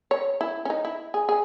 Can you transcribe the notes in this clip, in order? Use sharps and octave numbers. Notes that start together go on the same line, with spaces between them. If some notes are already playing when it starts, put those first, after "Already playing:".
C#5
E4
C#4
D#4
E4
G#4
G#4